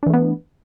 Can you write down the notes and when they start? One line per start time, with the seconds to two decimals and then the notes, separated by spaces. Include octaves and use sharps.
0.03 D4
0.06 E3
0.10 A3
0.14 B3